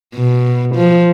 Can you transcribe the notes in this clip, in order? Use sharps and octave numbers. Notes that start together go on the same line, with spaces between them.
B2
F3